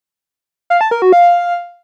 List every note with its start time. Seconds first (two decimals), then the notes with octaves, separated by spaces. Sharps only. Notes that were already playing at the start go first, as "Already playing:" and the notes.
0.70 F5
0.81 A5
0.91 A#4
1.02 F#4
1.13 F5